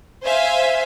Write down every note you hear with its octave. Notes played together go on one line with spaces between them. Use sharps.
C5 E5 F5 G#5